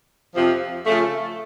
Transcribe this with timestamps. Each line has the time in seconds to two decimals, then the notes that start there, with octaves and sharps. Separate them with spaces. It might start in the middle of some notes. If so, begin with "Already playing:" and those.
0.35 F2 C3 F3
0.86 C#3 F3 A3